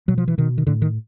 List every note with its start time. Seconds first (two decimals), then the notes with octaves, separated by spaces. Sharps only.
0.08 B2 F#3
0.18 F3
0.28 E3
0.38 B2 D#3
0.58 D#3
0.67 A2 D3
0.82 D#3